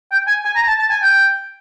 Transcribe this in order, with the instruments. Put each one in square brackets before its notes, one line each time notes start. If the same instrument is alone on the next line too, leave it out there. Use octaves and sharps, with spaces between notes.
[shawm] G5
G#5
G#5
A#5
A5
A5
G#5
G5